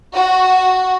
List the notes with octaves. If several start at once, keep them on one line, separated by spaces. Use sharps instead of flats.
F#4